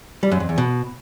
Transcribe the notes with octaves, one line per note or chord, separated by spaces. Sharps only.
G3
F#2
F2
E2
B2